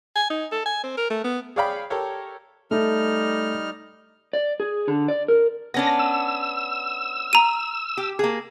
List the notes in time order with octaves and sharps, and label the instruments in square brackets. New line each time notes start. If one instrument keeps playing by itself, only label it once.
[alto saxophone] G#5
D#4
A4
G#5
C4
A#4
A3
B3
[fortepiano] G#4 C#5 D5 F5 G5 B5
G4 A4 A#4 C#5
[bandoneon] G3 D#4 F6 [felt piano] A3
[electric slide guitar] D5
G#4
D3
D5
A#4
[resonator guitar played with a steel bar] B3 C#4 D4 [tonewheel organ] A#6
[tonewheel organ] E6
[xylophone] A#5 D#7
[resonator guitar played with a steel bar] G4
A#3 G#4